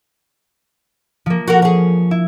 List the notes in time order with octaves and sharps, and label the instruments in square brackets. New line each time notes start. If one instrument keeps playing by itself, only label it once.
[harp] F3 A#3
[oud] F#4 A#4
C#4 G#4
[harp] E4